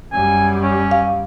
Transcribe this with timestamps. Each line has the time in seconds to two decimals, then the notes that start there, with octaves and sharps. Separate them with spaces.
0.13 F#2 G3 G#5
0.62 C#4
0.91 F5